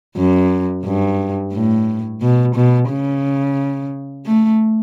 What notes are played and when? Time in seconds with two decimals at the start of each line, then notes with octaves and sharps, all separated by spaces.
0.16 F#2
0.85 G2
1.53 A2
2.22 B2
2.55 B2
2.89 C#3
4.26 A3